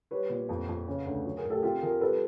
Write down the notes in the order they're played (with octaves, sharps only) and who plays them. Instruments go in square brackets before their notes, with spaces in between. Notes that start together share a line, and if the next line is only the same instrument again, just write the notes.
[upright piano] G3 B4 C#5
A#2
F2
F2
C#3
D2
F#3
G#4 A#4
A2
G4 A4
C3 F4 G4
F3 G#4 A#4
G3 A4 B4